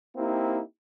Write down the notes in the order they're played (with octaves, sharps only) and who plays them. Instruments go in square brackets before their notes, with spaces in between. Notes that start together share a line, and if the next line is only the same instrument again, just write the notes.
[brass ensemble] A#3 C4 D#4 E4 G4